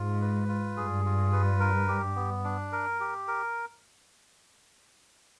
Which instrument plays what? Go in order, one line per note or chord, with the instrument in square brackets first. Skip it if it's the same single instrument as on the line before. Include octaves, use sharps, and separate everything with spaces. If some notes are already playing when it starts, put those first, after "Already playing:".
Already playing: [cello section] G#2 [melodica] F4
[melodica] B4
F4
[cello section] G2 [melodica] G#4
[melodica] F4
B4
A#4
G4
B3
D4
A#4
G4
A#4